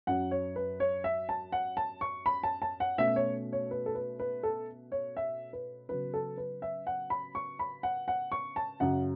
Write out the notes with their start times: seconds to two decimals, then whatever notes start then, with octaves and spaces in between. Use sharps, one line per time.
0.07 F#2 F#3 C#4 F#5
0.31 C#5
0.56 B4
0.80 C#5
1.04 E5
1.29 A5
1.52 F#5
1.77 A5
2.01 C#6
2.26 B5
2.43 A5
2.62 A5
2.80 F#5
2.98 B2 A3 C#4 E5
3.16 C#5
3.53 C#5
3.71 B4
3.86 A4
3.95 B4
4.19 B4
4.43 A4
4.92 C#5
5.17 E5
5.53 B4
5.89 C#3 F#3 B3 B4
6.14 A4
6.37 B4
6.62 E5
6.87 F#5
7.10 B5
7.35 C#6
7.59 B5
7.83 F#5
8.08 F#5
8.32 C#6
8.56 A5
8.80 F#2 C#3 F#3 F#5